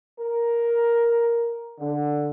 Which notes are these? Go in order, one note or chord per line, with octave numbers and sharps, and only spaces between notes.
A#4
D3